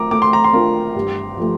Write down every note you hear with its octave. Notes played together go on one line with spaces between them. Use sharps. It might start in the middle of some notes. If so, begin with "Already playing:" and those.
Already playing: A3 F4 A#4 A#5 D6
A3 D6
C6
A#5
C6
D4 F4 A#4
G2
F3 A3